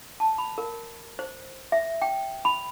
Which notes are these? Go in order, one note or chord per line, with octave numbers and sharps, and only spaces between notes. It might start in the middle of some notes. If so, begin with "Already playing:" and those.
A5
B5
A#4
C5
E5
G5
B5